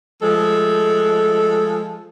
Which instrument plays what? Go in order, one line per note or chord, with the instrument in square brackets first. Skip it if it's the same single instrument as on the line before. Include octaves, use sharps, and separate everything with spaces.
[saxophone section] F3 G#3 A3 A4